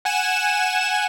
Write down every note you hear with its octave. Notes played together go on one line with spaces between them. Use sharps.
F#5 G#5 E7